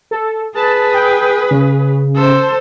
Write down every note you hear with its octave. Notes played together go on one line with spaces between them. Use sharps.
A4
G#4 B4 A5
G5
C#3
A4 C5